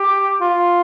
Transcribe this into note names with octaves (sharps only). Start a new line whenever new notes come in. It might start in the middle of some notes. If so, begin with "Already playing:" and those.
Already playing: G4
F4